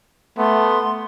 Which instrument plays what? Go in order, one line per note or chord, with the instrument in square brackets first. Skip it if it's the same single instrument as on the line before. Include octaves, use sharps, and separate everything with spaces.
[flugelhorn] A3 [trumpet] B3 [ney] C6